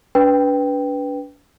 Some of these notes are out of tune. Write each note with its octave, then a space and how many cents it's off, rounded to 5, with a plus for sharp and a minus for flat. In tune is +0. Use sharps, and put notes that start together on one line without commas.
D4 -35 B4 +0 G5 +0